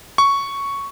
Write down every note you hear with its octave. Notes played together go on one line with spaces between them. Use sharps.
C#6